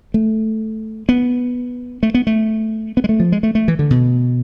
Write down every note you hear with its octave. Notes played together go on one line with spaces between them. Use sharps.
A3
B3
A3
B3
A3
B3
G#3
A3
F3
G#3
A3
A3
E3
D3
B2